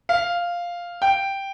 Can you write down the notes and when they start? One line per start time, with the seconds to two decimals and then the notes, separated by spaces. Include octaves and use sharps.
0.09 F5
1.02 G5